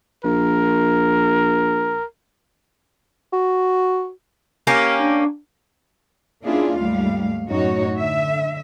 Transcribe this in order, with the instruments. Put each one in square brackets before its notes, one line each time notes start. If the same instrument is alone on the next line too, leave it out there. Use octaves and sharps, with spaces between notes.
[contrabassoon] A#1 [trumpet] A#4
[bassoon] F#4
[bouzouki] A#3 C#4 G4 [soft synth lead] F6
[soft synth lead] D4
[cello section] A#3 C#4 D4 E4 F4 G#4
D#2 G#2 G3 A3 F5
F#2 A2 D#4 F#4 C#5
D3 E5